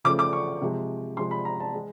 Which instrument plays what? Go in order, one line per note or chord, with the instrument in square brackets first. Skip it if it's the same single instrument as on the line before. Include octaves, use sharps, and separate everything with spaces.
[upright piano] C#3 F3 A3 D6
D6
C#6
C3 F3 G#3
C3 F3 G#3 C6
B5
A#5
A5
G#3